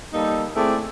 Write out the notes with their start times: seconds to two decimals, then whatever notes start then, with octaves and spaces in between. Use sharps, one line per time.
0.13 G3 A#3 D#4 G4 A4
0.56 A3 C4 E4 G#4 D5